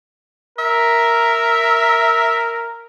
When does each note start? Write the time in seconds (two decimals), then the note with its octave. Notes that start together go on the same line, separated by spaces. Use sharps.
0.59 A#4 E5